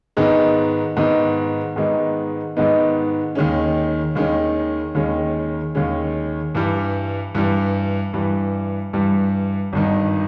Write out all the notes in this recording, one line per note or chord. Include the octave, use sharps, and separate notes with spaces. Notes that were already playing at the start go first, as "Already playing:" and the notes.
G#2 D#3 G#3 B3 D#4
G#2 D#3 G#3 B3 D#4
G#2 D#3 G#3 B3 D#4
G#2 D#3 G#3 B3 D#4
D#2 D#3 G#3 C#4
D#2 D#3 G#3 C#4
D#2 D#3 G#3 C#4
D#2 D#3 G#3 C#4
G2 E3 G3
G2 E3 G3
G2 E3 G3
G2 E3 G3
G#1 G2 D#3